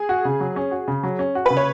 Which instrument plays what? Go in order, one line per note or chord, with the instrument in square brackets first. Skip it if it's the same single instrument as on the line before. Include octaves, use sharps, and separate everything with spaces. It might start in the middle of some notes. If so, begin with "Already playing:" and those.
Already playing: [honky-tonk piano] G#4
[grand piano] F#4
C#3
F#3
C#4
F#4
C#3
F#3
C#4
F#4
[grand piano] C#3 [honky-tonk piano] B4
[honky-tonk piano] C#5